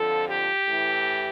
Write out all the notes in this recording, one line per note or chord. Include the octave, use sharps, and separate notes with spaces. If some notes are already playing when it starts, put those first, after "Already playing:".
Already playing: F2 D3 F3 A4
G4
A2 E3